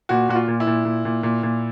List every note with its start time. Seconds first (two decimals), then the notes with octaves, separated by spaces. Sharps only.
0.09 A#2 F#4
0.29 A#2 F#4
0.35 F4
0.48 A#2
0.60 E4
0.67 A#2
0.85 A#2
1.05 A#2
1.23 A#2
1.43 A#2